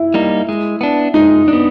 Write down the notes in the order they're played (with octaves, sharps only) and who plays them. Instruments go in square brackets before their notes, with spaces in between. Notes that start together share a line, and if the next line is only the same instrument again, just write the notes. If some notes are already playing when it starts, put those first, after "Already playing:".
Already playing: [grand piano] E4
[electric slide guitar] G3 A#3 D#4
G#3
B3 D4
[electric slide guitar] G#3 [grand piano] D#4
[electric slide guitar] D4
B3